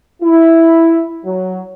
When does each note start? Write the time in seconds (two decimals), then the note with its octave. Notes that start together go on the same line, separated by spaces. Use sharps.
0.23 E4
1.25 F#3